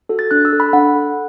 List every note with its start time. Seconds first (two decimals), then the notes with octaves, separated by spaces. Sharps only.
0.09 F#4 A4
0.19 A6
0.31 D4 F#6
0.45 E6
0.53 A4
0.60 B5
0.73 D4 F#5
0.95 A4